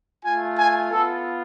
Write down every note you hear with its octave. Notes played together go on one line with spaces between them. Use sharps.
A3 F4 G#5
G#5
B3 F4 A4